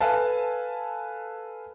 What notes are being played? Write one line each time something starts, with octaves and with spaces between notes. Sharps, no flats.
A4 B4 F5 G#5 A5